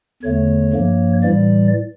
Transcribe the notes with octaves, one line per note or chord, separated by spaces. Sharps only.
E2 D3 A3 C#5
G2 F3 A#3
A2 E3 G3 D5